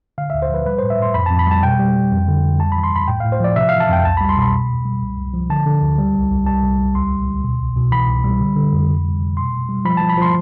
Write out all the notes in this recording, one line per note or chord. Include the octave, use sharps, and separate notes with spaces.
D3 F5
D2 E5
C5
F3 B4
G3 B4
A2 C5
E5
A2 C6
F2 B5
F2 A5
B5
G3 A5
B2 G5
G3
G3
F2
D3
F2
G3 A5
E3 B5
C6
D2 B5
A2 G5
A2 F5
C5
F3 D5
C3 E5
E3 F5
A5
F2 G5
C2 A5
G3 B5
C6
B2 B5
E2
E2
G3
C2
C2
F3
D3 A5
D3
D2
G3
C2
C2
G3 A5
C2
G3
D2 C6
D2
D2
B2
C2
B2
E3 B5
C2
G3
D3
D3
F2
C3
G3
C3
B2 C6
B2
G3
F3 B5
F3 A5
B5
F3 C6